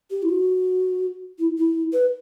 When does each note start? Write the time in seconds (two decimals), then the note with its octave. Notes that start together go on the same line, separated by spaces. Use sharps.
0.11 G4
0.23 E4
0.29 F#4
1.38 E4
1.57 E4
1.93 B4